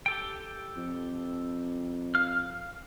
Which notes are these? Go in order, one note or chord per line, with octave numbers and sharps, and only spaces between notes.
G4 A4 G5
F2
F5 F6